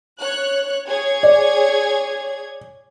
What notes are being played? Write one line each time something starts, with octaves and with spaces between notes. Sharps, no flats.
C#5 F#6
G#4 C#5 G#6
D5